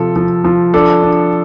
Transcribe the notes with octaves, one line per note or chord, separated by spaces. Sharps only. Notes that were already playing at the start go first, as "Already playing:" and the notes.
Already playing: C3 F3 A4
F3
F3
D4 A4
D4